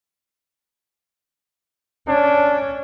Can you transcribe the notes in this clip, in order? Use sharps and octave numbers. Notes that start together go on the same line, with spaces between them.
C#4 D4